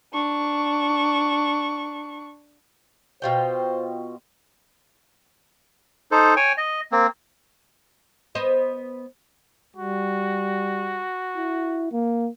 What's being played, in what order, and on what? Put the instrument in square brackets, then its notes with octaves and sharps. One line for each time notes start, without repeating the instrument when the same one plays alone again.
[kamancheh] D4 C#6
[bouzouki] B2 F4 G5 [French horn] C5
[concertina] D#4 A4 C5
C#5 G5 G#5
D#5
A#3 C4
[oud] B3 C5 D#5
[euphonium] G3 [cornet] F#4
[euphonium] E4
A#3